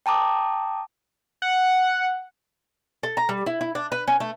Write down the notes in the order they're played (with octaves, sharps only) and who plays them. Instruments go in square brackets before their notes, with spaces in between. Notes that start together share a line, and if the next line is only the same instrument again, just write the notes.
[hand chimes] G5 A5 A#5 D6 D#6
[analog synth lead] F#5
[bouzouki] A4
A#5
G3
E4
E4
D4
B4
C#4
A3